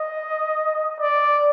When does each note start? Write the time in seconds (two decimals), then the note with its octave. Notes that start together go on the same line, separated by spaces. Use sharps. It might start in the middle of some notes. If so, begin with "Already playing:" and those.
Already playing: D#5
1.00 D5